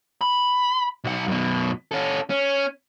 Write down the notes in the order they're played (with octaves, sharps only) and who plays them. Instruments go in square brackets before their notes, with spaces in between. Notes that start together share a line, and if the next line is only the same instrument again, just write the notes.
[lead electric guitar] B5
B1 F#5
F#2 B2
C#4 A4
C#4